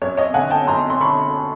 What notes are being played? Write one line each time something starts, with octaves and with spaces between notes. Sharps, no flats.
F#2 C#5
C#5 D#5
D3 F#5 G#5
G5 A5
F#2 A#5 C6
C6
D3 B5 C#6